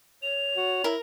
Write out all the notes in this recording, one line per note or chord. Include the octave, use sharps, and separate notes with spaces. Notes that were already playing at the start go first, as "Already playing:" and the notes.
C#5 F7
F#4
E4 A#4